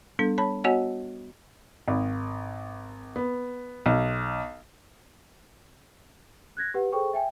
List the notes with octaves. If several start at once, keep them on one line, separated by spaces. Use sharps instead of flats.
G3 B3 D4 A4
C#5 A5 B5
B3 F#4 C#5 D#5 F#5 G#5
G#1
B3
B1
F#6 G#6 A#6
G4 B4 F#5
G#4 A4 C5 G5 C#6
E5 G5 G#5